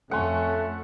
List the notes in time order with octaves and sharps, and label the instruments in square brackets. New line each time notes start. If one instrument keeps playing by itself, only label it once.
[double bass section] F2 [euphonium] A3 [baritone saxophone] C#4 [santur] F#5 C6 C#6